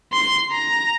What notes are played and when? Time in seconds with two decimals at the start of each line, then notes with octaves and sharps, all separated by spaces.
0.13 C6
0.51 A#5